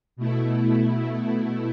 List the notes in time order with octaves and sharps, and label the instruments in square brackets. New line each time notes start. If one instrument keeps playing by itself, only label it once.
[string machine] B2 A3 E4